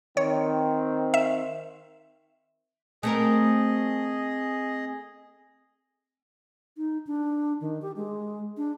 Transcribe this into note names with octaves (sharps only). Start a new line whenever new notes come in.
D#3 C4 C#5
E5
A3 C4 G#4 A#4 D#5
D#4
D4
D#3
G4
G#3
D4